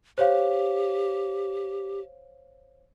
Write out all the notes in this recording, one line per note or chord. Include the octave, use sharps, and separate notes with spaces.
G4 C5 C#5 F5